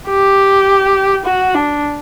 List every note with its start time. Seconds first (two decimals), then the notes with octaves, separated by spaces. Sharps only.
0.09 G4
1.25 F#4
1.55 D4